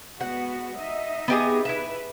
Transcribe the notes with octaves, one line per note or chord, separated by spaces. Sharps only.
G#3 B3 F#4 F#5
D#4 D#5 E5
B3 G4 G#4
E4 B4 E5